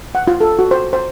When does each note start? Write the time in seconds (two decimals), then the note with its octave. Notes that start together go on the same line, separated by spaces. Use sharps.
0.15 F#5
0.27 F4
0.41 A4
0.59 F#4
0.71 C5
0.93 C5